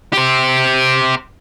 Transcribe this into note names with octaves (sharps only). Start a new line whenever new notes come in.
G4 C5